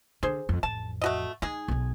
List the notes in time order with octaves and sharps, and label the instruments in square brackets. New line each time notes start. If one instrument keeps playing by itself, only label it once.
[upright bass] D3 [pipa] G#4 C5
[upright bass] F2
[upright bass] A1 F2 [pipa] A5
[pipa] A3 F#4 D#5
[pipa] G#3 G#4 [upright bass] D#4
[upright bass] B1 F#3